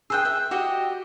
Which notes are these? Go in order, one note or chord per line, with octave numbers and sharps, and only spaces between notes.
G#4 C5 G5 E6 F#6
E5
F#4 G4 D#5